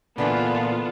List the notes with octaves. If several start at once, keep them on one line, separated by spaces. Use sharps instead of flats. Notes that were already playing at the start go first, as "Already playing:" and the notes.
A#2 D3 E3 B3 F4 A4 A5